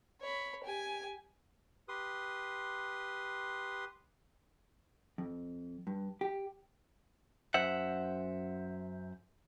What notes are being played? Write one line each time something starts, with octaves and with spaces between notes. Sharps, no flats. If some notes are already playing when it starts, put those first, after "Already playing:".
C#5 B5
G4 G#5
G4 B4 C6 D#6
F2
G2
G4
F#2 C5 E5 F#5